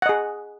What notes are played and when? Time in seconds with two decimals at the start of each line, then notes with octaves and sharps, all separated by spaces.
0.02 F#5
0.06 D#5
0.09 G#4